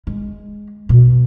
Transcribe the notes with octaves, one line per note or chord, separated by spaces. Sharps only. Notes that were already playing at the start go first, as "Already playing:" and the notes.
G#3
B2